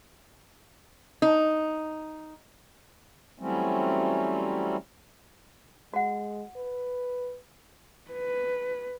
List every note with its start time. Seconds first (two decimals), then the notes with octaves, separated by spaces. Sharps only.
1.22 D#4
3.39 E3 F#3 G3 A3 C4 C#4
5.94 G#3 F#4 F#5
6.56 B4
8.11 B4